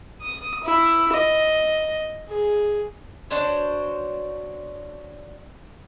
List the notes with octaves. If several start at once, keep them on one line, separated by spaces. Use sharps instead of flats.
D#6
E4
D#5
G#4
D4 F#4 C5 C#5